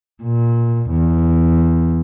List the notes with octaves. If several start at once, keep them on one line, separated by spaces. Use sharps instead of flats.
A#2
E2